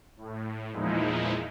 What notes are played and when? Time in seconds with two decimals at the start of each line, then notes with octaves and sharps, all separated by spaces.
0.17 A2
0.72 E2 A#2 F3 G#3 D#4 E4